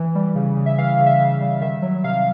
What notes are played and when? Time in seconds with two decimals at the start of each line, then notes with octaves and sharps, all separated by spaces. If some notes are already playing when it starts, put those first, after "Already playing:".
Already playing: E3
0.15 G3
0.35 C#3
0.57 C#3
0.66 E5
0.78 E3 F5
0.99 C#3
1.06 E5
1.20 C#3
1.41 G3
1.61 D#3 E5
1.82 F#3
2.04 C3 F5